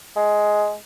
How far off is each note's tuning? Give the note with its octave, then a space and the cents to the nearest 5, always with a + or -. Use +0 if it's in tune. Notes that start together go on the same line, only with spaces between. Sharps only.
G#3 +10